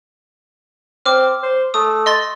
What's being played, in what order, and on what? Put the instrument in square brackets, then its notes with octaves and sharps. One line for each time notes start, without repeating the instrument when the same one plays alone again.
[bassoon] C4 [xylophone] D6 F6
[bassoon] C5
[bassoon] A3 [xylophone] D#6
[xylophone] D#5 C6 A6